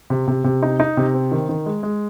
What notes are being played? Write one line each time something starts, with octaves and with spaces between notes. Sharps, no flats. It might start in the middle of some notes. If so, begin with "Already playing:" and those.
C3
C3
C3
D#4
D#4
C3
C4
D#3
D#3
G#3
G#3